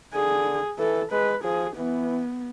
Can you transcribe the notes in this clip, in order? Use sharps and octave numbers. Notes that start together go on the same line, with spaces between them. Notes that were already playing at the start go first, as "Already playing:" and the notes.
D3 G#4
E3 A4
G#3 B4
F3 G#4
E3 B3